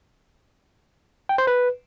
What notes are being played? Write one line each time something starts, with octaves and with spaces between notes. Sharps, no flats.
G5
C5
B4